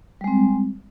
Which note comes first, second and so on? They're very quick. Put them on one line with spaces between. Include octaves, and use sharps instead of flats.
G3 G#3 C4